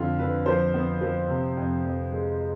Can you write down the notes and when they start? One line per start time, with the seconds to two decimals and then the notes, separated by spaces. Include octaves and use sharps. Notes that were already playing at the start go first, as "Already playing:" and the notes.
Already playing: F2 D3 F4
0.18 D3 B4
0.46 F3 C5
0.74 B3
1.01 F3
1.28 C3
1.57 F2
1.84 F2
2.12 G#3